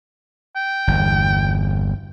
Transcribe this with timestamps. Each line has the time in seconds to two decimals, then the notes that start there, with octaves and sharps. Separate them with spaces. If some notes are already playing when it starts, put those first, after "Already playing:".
0.56 G5
0.87 G1 E2